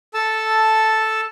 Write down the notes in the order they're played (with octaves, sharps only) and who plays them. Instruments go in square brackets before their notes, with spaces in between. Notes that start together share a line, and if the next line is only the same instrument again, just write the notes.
[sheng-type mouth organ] A4 A5 E6